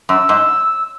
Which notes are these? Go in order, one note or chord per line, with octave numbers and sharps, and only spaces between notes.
F#2 E6
G#2